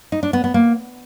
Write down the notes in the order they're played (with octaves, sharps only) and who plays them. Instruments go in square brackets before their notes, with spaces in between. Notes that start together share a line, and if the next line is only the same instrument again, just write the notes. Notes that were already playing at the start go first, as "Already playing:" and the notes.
[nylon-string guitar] D#4
D4
B3
B3
A#3